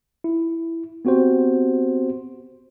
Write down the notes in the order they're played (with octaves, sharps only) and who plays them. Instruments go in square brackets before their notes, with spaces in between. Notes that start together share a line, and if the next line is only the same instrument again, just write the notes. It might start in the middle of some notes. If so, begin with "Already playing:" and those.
[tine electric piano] E4
B3 C4 F#4 G4 C5